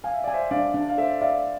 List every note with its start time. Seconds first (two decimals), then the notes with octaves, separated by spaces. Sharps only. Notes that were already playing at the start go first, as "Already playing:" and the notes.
0.04 F5 G#5
0.14 E5
0.24 D5 G#5
0.34 C5 E5
0.51 D4 D5 F5
0.74 D4
0.89 F5
0.98 A4 C5 E5
1.21 D5 E5 F5